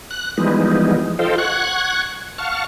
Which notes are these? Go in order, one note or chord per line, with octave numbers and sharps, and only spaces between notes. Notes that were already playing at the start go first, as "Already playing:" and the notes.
F#6
E3 F3 G3 G#3 B3 D#4
F4 A4 C5 D#5 F5 G5
F#5 C#6 F#6 G#6
F5 F#5 A5 C#6 F6